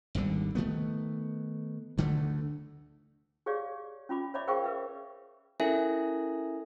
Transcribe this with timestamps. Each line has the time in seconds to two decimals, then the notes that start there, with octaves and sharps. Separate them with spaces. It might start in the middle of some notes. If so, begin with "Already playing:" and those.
0.15 G#1 D#2 D3 G3
0.55 D#3 E3 A3 B3
1.98 D2 D3 A3
3.46 G4 G#4 C#5 D5 F5
4.09 C#4 F4 B5 D6
4.34 C#5 D5 E5 B5 D6
4.47 G#4 A#4 C5 F5 G5 C#6
4.64 A#4 B4 E5
5.60 C#4 E4 A4 A#4 E5 G#5